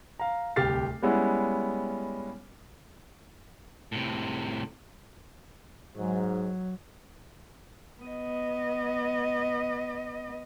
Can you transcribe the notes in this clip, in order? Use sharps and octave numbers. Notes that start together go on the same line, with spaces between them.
F5 A#5
D1 C2 G4 F6 A6 C7
G3 G#3 B3 C#4 E4
A2 C3
G#2 F#3
B3 D#5